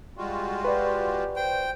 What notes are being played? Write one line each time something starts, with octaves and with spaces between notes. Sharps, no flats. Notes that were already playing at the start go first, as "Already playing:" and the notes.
G3 G#3 F4 F#4
G4 B4 D5
C5 G5